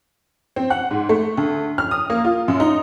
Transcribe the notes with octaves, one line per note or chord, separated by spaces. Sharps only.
C4
F#5
G#2
A3
D2
F6
D#6
A#3
F4
F#2
D#4